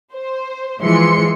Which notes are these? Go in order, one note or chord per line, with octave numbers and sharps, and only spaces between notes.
C5
E3 F3 G#3 C6 C#7